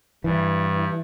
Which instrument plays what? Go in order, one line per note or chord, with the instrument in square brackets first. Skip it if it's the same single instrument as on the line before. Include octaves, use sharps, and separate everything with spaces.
[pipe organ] G2 [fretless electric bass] E3